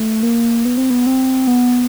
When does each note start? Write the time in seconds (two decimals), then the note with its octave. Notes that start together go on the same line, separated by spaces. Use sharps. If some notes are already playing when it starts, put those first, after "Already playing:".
Already playing: A3
0.23 A#3
0.65 B3
0.77 C4
0.90 B3
1.06 C4
1.47 B3